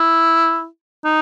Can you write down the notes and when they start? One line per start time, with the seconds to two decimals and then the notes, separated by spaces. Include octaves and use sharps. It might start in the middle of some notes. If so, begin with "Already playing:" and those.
Already playing: E4
1.05 D#4